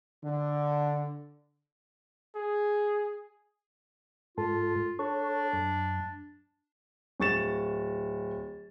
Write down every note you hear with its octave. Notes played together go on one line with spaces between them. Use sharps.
D3
G#4
G#2 F4 A4
D4 A4 C#5
F#2
D1 C#6 A6 E7